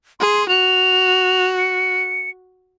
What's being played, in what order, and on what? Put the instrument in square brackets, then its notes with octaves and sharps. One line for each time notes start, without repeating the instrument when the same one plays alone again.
[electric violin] G#4 [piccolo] C6
[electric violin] F#4 [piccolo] F7
[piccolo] C#7